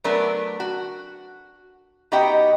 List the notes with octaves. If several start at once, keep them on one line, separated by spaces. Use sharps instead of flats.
F#3 A3 B3 D4 A#4 D5
F#4
B2 D#4 G4 D#5 F#5 G5